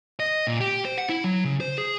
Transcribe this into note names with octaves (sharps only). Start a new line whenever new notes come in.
D#5
A#2
G4
C5
F#5
E4
F#3
C#3
C5
G#4